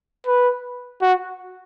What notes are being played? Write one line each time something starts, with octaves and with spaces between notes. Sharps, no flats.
B4
F#4